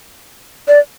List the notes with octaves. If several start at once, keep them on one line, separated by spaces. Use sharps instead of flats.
D5